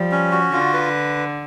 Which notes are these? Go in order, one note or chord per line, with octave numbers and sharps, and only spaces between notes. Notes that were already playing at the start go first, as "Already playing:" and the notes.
Already playing: F3 G3
C#4
F#4
D3 F4
B4